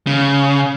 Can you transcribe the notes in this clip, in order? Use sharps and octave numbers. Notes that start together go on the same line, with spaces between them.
C#3